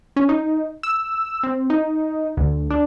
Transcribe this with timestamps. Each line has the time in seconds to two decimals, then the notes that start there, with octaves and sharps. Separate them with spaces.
0.16 C#4
0.29 D#4
0.83 E6
1.43 C4
1.70 D#4
2.37 D2
2.70 D4